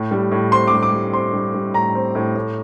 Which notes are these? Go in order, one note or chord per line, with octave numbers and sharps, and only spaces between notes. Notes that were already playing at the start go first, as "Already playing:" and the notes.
Already playing: A2
G3
A2
C4 C6
D6
G3
D6
G3
C4 C6
G3
G3
A2 A#5
C4
A2
A2